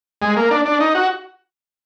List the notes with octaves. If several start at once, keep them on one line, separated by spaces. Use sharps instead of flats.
G#3
A#3
D4
D4
D#4
F#4